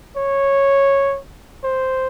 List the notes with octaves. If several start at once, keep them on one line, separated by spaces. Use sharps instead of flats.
C#5
C5